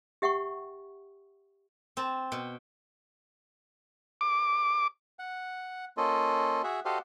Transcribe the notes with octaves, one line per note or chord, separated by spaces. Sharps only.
G4 E5 F#5 G5 C#6
C4 A5
B2 G5
D6
F#5
A#3 C#4 F4 A4 D#5
F#4 G#4 E5
F#4 G4 A4 C5 D#5 F5